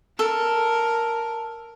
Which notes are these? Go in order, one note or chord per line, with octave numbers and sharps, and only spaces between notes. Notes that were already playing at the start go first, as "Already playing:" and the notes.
A4 A#4